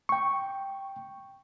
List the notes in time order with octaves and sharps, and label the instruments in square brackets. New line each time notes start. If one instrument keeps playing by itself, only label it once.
[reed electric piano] G5 C#6